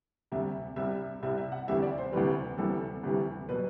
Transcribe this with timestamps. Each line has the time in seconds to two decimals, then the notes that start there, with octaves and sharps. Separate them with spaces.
0.32 D2 C3 G3 E5
0.76 C2 C3 G3 E5
1.23 C2 C3 G3 E5
1.38 E5
1.52 F#5
1.68 D2 C3 E3 G3 E5
1.82 D5
1.98 C5
2.13 D2 C3 E3 G3 B4
2.58 D2 C3 E3 G3 A4
3.03 D2 C3 E3 G3
3.49 B2 F#3 B4